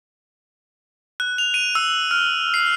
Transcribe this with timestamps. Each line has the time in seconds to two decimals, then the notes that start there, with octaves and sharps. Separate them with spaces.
1.20 F#6
1.38 F7
1.54 D#7
1.75 E6
2.11 F6
2.54 C7